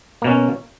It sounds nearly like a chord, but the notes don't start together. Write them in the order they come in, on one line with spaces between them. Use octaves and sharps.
A#3 B2 C#4